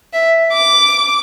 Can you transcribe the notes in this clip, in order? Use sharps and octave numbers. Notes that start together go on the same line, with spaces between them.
E5
D6